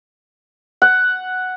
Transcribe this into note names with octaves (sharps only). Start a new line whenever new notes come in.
F#5